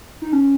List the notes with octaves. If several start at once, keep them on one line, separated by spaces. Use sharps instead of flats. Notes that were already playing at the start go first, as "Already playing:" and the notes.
D#4
C#4